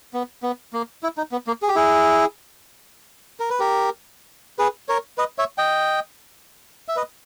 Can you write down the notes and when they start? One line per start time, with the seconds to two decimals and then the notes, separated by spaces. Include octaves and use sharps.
0.14 B3
0.43 B3
0.73 A#3
1.03 E4
1.17 D#4
1.32 B3
1.47 A#3
1.62 G#4
1.68 G4
1.75 E4 G#4
3.40 A#4
3.50 B4
3.60 G4 A#4
4.59 G#4 B4
4.89 A#4 C#5
5.18 B4 D#5
5.38 C#5 E5
5.58 D#5 G5
6.88 E5
6.96 B4 D#5